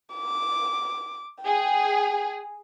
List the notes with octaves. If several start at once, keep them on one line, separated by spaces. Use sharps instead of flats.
D6
G#4 G5